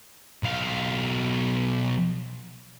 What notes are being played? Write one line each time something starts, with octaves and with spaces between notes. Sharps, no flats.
B1 F5